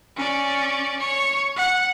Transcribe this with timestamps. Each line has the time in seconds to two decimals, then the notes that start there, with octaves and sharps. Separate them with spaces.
0.16 C#4 D5
0.99 C#5
1.56 F#5